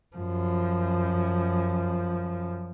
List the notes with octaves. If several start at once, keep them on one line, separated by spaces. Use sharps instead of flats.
F#2 F3